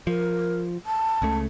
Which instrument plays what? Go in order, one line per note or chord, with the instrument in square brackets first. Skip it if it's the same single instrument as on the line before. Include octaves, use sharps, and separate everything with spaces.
[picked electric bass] F3 [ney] A#4
[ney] A5
[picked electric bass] C#2 C#3 A3